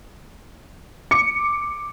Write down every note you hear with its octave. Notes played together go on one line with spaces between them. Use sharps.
D6 C#7